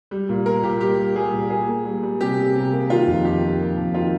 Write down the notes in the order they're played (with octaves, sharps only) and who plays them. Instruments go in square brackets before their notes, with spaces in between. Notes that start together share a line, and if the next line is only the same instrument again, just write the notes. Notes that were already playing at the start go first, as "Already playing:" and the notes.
[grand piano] G3
A#2
A#3 A#4
A#2 G4
G3 G4
A#3
G3 G#4
A#2
A#3 G#4
A#3
G3
G3
C3 G4
C3
C3
A#3
D#3 F4
F2
D#3 G4
D#3
A#3
F2
D#3 F4